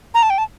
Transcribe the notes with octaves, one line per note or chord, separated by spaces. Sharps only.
A#5
A5
G5
A5